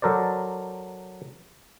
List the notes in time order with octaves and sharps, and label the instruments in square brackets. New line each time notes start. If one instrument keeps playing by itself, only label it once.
[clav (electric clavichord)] F#3 A4 A#4 C5 D5